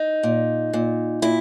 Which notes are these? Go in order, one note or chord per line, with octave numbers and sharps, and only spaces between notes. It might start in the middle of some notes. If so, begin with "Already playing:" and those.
Already playing: D#4
A#2
A#2
A#2 E4